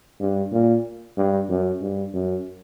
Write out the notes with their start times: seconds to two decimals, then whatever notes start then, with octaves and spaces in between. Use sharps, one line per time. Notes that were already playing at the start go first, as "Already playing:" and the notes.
0.20 G2
0.52 A#2
1.17 G2
1.49 F#2
1.81 G2
2.14 F#2